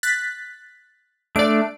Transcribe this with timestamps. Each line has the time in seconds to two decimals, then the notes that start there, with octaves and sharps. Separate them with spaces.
0.03 F#6 A6 B6
1.36 A3 D4 D5 D7